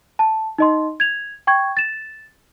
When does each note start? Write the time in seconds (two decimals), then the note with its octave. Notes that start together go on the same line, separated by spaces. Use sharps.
0.19 A5
0.58 D#4 D#5 C6
1.00 G#6 F7
1.47 G5 C#6 G#6
1.77 A6 E7